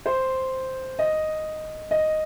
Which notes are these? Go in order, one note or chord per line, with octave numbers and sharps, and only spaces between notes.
C5
D#5
D#5